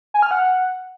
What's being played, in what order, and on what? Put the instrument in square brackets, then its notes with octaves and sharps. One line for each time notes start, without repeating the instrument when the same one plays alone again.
[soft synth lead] G#5
F6
F#5